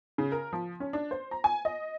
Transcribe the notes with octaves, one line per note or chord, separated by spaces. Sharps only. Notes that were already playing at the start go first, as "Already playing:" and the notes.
C#3
A#4
F3
C#4
D4
C5
A#5
G#5
D#5